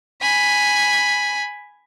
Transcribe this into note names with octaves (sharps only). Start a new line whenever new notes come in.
G#5 B5